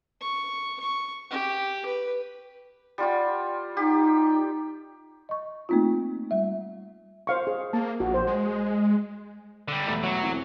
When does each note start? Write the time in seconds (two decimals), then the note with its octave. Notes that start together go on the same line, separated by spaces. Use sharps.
0.21 C#6
0.80 C#6
1.31 G4
1.86 B4
2.98 G3 F4 G4
3.77 D#4 G4
5.29 D#5 C#6
5.69 A3 A#3 C4 D#4 F4
6.31 G3 E5
7.27 C5 F5 C#6
7.47 G#4
7.73 A#3 A5
8.00 A#1 F#4
8.14 C5
8.27 G#3
9.68 D3 G3
9.86 E1 A3 B5
10.03 F#3
10.23 E3 C4